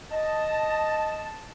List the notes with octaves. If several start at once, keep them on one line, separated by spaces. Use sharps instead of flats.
D#5 A5